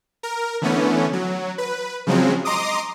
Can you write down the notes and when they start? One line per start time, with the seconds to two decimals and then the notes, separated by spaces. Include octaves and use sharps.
0.23 A#4
0.62 D3 E3 A3 B3 C#4
1.13 F#3
1.58 B4
2.07 C#3 F3 F#3 G#3 C4
2.45 D#5 A#5 C6 D6 D#6